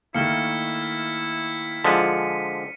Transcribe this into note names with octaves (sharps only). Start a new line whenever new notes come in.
D#3 A3 A#3 E4 F6 C#7
D3 F3 G#3 B6 C#7 D#7